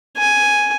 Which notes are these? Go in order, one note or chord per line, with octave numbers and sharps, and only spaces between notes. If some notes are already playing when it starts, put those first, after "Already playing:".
G#5